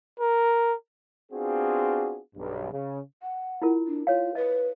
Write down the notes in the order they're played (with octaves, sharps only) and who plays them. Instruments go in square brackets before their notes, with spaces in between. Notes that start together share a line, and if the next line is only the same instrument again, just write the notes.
[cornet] A#4
[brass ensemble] B3 C4 D4 F4 F#4 G#4
B1 G2
C#3
[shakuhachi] F#5
[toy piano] E4 F4 A#4
[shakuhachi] D4
[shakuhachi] F4 [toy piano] C#5 F5
[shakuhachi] B4 [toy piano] D#5